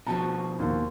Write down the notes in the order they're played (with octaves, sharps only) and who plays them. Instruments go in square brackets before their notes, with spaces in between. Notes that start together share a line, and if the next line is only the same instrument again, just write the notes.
[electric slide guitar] B2 F3 [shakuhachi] F#4 [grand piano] A5
[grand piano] D#2 [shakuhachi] C6